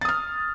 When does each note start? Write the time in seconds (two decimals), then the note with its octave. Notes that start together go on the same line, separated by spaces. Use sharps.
0.01 A6
0.05 D#6
0.09 F6